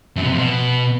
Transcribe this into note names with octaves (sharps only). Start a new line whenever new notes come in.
F#2
B2
C3
F2
B2